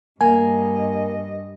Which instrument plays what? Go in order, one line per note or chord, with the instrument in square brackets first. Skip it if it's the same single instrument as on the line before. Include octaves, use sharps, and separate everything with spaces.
[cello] G2 D#5 [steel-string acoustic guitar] A#3 [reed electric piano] G#5